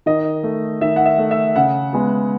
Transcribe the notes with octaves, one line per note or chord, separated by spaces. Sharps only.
D#3 D#5
A3
D#3 E5
F#5
E5
A3
E5
C#3 F#5
G#3 B3